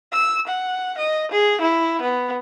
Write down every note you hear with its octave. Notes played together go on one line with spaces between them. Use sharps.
E6
F#5
D#5
G#4
E4
B3